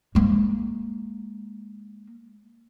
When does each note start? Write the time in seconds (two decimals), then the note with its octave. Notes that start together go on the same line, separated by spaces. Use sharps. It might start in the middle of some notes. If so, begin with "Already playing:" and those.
0.15 G#3 A#3